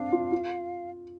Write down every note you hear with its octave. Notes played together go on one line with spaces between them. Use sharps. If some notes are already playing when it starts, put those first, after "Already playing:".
Already playing: C4 D4 F5
F4
F4